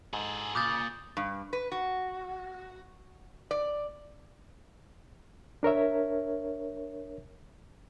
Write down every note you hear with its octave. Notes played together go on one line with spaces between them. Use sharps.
G#2 G#4 A4
A#2 C#3 D6 D#6 G6 A6
G2
B4
F#4
D5
D4 A#4 C#5 E5